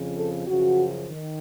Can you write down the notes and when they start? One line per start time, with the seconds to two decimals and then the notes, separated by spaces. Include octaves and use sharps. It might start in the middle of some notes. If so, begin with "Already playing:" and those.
Already playing: F2 C#3 F3
0.17 A4
0.47 F#2 C#3 F3 F#4
1.09 D#3